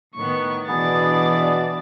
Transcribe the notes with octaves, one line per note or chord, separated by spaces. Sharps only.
A2 D#3 B3 C#6
B2 E3 B3 D4 G#4 D5 A6